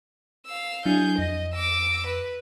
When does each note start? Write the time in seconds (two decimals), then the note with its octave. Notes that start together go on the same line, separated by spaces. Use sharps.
0.47 F5 E6
0.86 F#3 D4 E4 G#4 G6
1.18 F2 D#5 A#6
1.54 D6 E6
2.07 B4